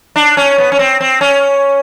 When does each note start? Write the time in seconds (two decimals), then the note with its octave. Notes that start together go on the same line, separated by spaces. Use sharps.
0.16 D4
0.37 C#4
0.58 B3
0.72 C#4
0.79 C4
1.01 C4
1.21 C#4